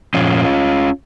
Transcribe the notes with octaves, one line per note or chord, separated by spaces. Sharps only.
A#2 F3 C#4 F4